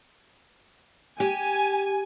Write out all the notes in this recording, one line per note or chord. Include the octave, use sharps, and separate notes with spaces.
G4 G#5